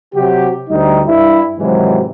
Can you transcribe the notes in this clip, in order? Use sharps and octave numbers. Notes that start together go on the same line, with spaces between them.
C3 F#3 F#4 G4
D2 G3 D#4
G2 E4
G#2 C3 D#3 E3 F#3